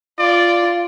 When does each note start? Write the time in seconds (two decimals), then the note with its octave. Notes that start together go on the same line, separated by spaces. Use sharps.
0.19 F4 D5